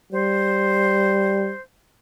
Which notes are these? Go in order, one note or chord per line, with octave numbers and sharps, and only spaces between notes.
G3 C5